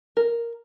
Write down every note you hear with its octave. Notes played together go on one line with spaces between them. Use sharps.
A#4